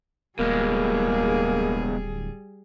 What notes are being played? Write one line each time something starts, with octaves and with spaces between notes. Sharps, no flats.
D1 B2 G3 G#3 A#3 G#4